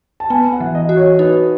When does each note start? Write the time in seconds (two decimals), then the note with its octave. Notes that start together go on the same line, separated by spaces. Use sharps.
0.20 A5
0.30 B3 G#5
0.53 F#5
0.61 E3
0.75 D#5
0.89 F#4
0.97 C#5
1.19 D#4 B4